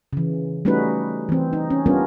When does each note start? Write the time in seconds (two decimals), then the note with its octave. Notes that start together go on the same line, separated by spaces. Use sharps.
0.13 C#3 E3
0.65 G3 A3 C#4 D#4 F#4 B4
1.29 E3 C4
1.53 D#4
1.70 C#4
1.86 G3 B3 C#4 D4 F4 A#4